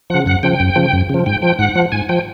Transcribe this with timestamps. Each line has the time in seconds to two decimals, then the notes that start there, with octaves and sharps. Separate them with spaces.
0.10 C#3 F3 F#5
0.26 F#2 F#5
0.43 C#3 F3 G5
0.60 F#2
0.76 C#3 F3
0.93 F#2
1.10 C#3 F3
1.26 G#2 G5
1.42 F3 G5
1.59 G#2 F#5
1.76 F3
1.92 G#2 G#5
2.09 F3 G5